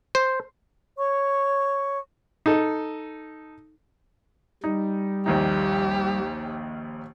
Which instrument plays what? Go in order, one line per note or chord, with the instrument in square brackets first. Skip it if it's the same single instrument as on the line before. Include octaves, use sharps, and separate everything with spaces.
[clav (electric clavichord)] C5
[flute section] C#5 C#6
[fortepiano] D#4 A4
[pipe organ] G3 [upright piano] D#4
[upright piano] A#1 D#2 D#4 [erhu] G4